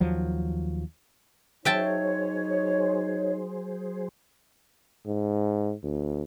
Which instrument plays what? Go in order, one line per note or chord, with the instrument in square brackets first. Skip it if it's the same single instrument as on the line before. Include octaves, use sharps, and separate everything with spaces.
[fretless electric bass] D#2 F3 F#3
[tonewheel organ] F#3 G#4 C5 [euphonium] D#4 [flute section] C#5 [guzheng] E5 G5 A5
[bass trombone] G#2
D2